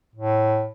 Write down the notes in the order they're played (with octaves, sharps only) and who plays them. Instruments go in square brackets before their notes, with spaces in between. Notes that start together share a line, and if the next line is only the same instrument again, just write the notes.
[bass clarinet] A2